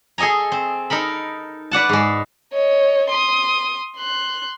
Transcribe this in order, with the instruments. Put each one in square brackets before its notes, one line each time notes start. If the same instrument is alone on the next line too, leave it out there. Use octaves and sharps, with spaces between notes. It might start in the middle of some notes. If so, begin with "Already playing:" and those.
[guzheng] G#4 A4 D#5 G#5 A#5
C4
D#4 A4 A#4 B5
B4 D5 F#5 A5
G#2 G#3
[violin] C#5 D#5
C6 D#6
C6 F#6